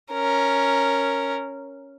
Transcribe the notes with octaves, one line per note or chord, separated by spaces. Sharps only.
C#4 A#4